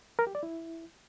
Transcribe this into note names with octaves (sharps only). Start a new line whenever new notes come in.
A#4
G4
D5
E4